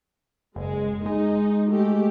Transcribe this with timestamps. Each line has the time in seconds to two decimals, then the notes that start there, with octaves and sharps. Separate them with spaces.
0.56 F#1 G#3
1.06 G#3 D#4
1.69 A3 G4